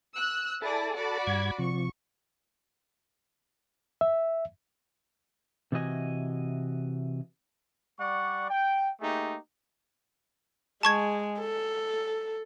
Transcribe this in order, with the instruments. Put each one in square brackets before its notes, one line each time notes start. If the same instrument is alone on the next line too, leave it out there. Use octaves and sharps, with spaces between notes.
[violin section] E6 F#6
[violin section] E4 G#4 D5 [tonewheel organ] A4 A5
[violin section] F#4 D5 B5
[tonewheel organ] G2 G#6
[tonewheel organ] C3 F3 [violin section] C#6
[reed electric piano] E5
[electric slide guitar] C3 E3 E4 F#4 D#5 G#5
[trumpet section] G3 D5 F#5 C#6
G5
A3 A#3 D#4 G4 G#4
[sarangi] G#3 [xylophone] A5 C#6 G#6
[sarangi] A4